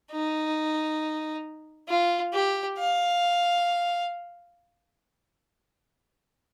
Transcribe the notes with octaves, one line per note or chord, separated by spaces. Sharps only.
D#4
F4
G4
F5